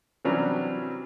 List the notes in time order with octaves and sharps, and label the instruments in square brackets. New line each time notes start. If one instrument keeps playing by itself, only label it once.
[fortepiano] C3 E3 F#3 G3 C#4 D4